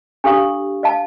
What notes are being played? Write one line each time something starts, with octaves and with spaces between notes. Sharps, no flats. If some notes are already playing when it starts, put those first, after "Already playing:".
D4 G4 A4 F5 C#6
D#5 F5 A5